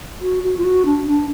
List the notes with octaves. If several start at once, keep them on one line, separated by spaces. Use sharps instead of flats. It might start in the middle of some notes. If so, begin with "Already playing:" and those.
F#4
F#4
F4
F#4
D4
D4